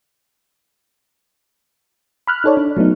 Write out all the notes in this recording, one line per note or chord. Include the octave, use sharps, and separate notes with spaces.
B5 F6 F#6
D#4 A4 C#5 D5
D4
F#3 A3 B3 D#4